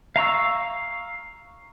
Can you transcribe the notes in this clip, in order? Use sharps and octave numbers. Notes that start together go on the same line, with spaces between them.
F5 A#5 C#6 E6